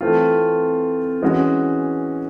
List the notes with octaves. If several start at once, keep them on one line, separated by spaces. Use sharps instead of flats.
E3 A3 C4 F4
E3 G#3 C#4 F#4